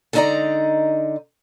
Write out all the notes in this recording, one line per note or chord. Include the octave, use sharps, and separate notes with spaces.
D3 G#3 D#4 D5 D#5 A#5